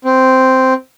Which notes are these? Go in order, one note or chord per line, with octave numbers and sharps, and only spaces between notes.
C4